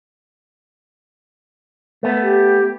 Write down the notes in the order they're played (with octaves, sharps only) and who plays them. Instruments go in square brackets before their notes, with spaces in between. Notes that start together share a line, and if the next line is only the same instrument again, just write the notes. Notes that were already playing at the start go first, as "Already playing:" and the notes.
[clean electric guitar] A3 B3
[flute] G4